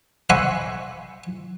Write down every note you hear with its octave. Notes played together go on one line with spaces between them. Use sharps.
C5 E5 F#5 G#5 B5 C#6